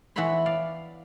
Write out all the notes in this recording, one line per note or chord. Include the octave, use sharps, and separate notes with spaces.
E3 B3 E4 C#5 B5 C6
D5 F5